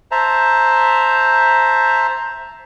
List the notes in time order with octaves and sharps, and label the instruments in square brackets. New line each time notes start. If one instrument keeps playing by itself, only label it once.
[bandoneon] C5 E5 A5 A#5